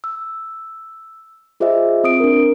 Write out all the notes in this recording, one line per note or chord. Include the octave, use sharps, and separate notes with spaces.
E6
F4 G#4 C5 D#5 E5
C4 D#6 D7
D4 A#4